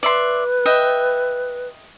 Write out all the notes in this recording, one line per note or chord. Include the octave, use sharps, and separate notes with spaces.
B4 D5 E5 C6
D#5 E5 G5